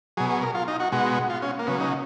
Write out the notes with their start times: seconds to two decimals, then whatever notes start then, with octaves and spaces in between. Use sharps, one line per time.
0.17 B2 F#3 G#4
0.30 G#4
0.42 A#4
0.55 F4
0.68 D#4
0.80 F#4
0.92 B2 G#3 F#4
1.30 F4
1.42 C#4
1.59 A#3
1.67 C#3 F#3 B3
1.80 D#4